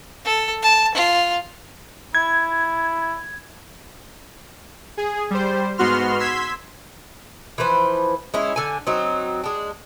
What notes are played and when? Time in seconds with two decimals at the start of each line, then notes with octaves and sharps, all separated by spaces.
0.25 A4
0.62 A5
0.95 F4
2.15 E4 G#6
4.97 G#4
5.30 G3 C5
5.78 G#2 B3 F#4 C6 F6
6.19 C6 E6 G#6 B6
7.58 E3 F3 B4 C5
8.34 G#3 C#4 E4
8.56 D3 G#5
8.87 F#3 C4 D#4
9.44 G#3 D4